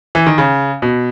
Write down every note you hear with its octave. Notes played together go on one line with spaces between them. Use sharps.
E3
D#3
C#3
B2